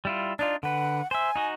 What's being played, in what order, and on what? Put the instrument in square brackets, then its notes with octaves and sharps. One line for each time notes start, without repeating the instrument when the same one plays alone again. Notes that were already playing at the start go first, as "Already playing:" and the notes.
[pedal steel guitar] G3 E4 F4
[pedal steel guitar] D4 D#4 F4 [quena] D5
[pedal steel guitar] D3 B4 [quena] F#5
[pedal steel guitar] C5 E5 [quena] G#5
[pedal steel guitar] D#4 F#4 D#5